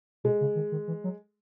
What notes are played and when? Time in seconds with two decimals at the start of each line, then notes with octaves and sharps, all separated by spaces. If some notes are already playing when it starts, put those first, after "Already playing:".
0.24 B2 G#3
0.41 C#3
0.55 D#3
0.72 D#3
0.88 E3
1.04 F#3